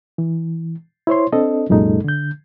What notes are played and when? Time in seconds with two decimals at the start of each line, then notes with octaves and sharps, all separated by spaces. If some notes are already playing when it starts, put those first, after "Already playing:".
0.18 E3
1.07 E4 C5 C#5 C6
1.33 C4 D4 A4 D#5
1.69 C2 F#2 A#2 G#3 D#4 A4
2.04 D3 G6